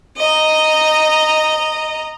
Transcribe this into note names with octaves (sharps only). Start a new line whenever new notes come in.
D#5 A#5